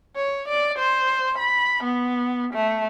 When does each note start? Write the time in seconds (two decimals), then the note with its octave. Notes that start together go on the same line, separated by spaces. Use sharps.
0.16 C#5
0.48 D5
0.79 C5
1.38 B5
1.83 B3
2.54 A3